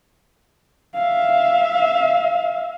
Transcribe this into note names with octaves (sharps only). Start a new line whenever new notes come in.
E5 F5